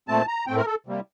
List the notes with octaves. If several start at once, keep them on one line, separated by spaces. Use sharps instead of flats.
A#2 A3 C4 A5
A#5
A2 A3 C4 G5
A#4
A4
C3 G3 A#3